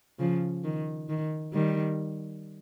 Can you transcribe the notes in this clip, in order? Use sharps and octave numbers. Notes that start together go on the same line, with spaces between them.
C#3 F3
D#3
D#3
D#3 G3